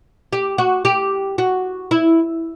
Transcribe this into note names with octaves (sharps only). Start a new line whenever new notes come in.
G4
F#4
G4
F#4
E4